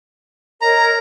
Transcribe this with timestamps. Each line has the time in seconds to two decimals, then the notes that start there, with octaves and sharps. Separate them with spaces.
0.62 A#4 C#5 D#5 A#5